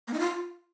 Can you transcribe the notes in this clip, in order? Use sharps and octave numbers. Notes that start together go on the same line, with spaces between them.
A#3
D#4
F4